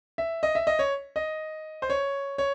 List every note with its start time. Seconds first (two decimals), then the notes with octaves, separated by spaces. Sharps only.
0.18 E5
0.43 D#5
0.55 E5
0.67 D#5
0.79 C#5
1.16 D#5
1.82 C5
1.90 C#5
2.38 C#5